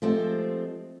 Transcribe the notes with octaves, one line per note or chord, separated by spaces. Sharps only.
F3 G#3 A3 C4 G4